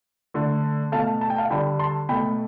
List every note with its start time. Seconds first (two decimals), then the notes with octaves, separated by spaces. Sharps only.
0.34 D3 A3
0.92 B2 A3 F5 A5
1.21 A5
1.30 G5
1.38 F5 A5
1.50 D3 G3 G5 B5
1.79 A5 C6
2.09 B2 A3 G5 B5